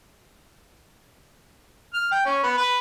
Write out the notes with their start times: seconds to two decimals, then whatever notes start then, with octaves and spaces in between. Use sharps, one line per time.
1.94 F6
2.12 G5
2.26 C#4
2.43 B3
2.57 B4